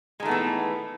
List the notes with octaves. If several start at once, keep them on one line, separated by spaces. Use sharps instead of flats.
D#3 E3 G#3 A3 B3